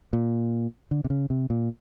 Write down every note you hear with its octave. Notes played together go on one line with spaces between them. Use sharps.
A#2
D3
C3
C#3
C3
A#2